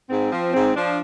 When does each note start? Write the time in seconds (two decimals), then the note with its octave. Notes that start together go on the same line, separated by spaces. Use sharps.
0.09 G#2 C4
0.32 F3
0.53 G#2 C4
0.76 F3 D4